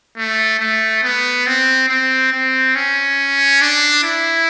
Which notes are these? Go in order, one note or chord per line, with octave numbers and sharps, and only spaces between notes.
A3
A3
B3
C4
C4
C4
C#4
D4
E4